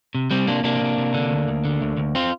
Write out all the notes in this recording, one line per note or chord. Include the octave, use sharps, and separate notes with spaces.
C3
C3 G3 C4
C3 A#3 D4
C3 A#3 D4
C3
C3
D3
D2
D2
D3
D2
D2
C4 F4